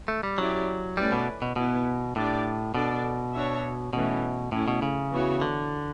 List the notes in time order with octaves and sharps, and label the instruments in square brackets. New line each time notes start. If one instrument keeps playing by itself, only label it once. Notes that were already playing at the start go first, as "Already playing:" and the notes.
[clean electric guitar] A3
G3
[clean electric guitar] F#3 [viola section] C#4 E4 G4 D5
[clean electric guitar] G3 [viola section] A3 C#4 E4 B4 D5
[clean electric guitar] B2
B2
[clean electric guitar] B2 [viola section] B3 E4 B4
[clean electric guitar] A2 [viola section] D4 G4 D5
[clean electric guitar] B2 [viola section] D4 A4 D5
[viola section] D4 F#4 C#5 E5
[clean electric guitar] B2 [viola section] E3 A3 C#4
[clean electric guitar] A2 [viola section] A3 C#4 E4
[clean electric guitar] B2
C#3
[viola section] E3 B3 F#4 C#5
[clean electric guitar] D3